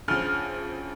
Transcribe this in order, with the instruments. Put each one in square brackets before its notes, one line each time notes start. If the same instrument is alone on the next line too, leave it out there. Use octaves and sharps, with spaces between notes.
[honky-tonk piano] D2 C#3 F3 F6